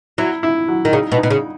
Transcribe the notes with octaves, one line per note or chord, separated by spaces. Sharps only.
F#3 E4
E4
F#3
D#3
C#3 D#4
B2
D#4
B2
C#3